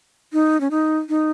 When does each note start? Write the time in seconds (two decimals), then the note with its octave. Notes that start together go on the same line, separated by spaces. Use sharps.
0.33 D#4
0.61 C#4
0.71 D#4
1.09 D#4